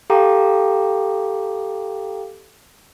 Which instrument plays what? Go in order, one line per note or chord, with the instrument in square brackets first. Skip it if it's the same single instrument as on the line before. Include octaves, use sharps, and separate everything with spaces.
[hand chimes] G4 A4 F5 G5 A#5 D6